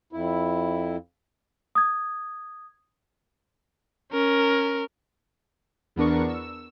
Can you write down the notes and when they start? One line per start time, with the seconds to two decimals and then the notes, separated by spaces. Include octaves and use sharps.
0.13 F2 E4
1.75 D#6 G#6
4.12 C#4 A#4
5.96 E2 B3 D4 A#4 C#6
6.28 E6